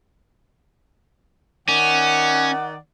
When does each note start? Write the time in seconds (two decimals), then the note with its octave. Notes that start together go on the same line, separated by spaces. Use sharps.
1.69 D#3 C#4 D5 F#5